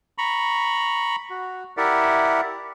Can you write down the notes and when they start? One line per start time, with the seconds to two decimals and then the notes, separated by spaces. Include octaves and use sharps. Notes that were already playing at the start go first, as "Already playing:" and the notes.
0.18 A#5 B5 C#6
1.30 F#4
1.77 E4 G4 A#4 D5 E5 F#5